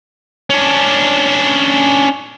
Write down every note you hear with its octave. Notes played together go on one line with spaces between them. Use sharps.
C#4 D4